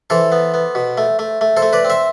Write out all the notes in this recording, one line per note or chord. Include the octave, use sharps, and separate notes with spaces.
E3 A4 C5
B3
B3
B2
A3
A3
A3
A4 C5
A3
B4 D5
C4
C5 E5